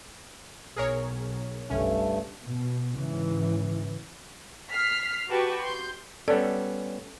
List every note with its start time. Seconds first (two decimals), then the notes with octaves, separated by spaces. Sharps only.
0.76 B1 G#4 A#4 C#5
1.70 G1 C2 G2 A3 C#4
2.43 B2
2.95 G#2 C#3 E3
4.71 F6 B6 C7
5.29 F#4 G4 B4 G5 A5 C#6
5.63 C6 G6
6.28 G3 B3 C#4 A4 D5